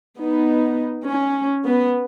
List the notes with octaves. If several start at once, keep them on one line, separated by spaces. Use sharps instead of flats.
B3 D#4
C#4
B3